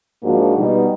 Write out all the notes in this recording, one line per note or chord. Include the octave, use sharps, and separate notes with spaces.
G#2 F3 A#3 D4 F#4
B2 G3 B3 D#4